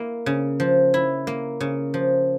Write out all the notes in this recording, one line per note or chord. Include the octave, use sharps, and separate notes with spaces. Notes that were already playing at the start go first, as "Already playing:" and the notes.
Already playing: A#3 E4
C#3
F3
E4
A#3
C#3
F3